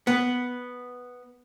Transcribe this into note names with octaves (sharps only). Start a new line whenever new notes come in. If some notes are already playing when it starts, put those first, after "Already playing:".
B3